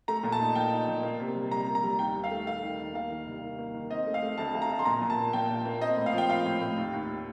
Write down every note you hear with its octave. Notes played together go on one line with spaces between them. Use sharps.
A3 A#5
A#2
A5
D#4
A#2 G5
D#4
A#2
A#3
C3
G3
G3 A#5
A#3
A#5
G3
D#2 G5
D#2
F5
A3
D#2 F5
D#3
D#2
A#3 F5
D#3
C2
D#3
A#3
D#3
C4 D#5
A3
F5
A3
D2 A5
D2
A#5
D2
C6
A#2 A#5
A#2
A5
A#3
A#2 G5
A#2
A#3
C4 D#5
A2
F5
F3
G5
F3 F5
A2
A2
D#2
D#2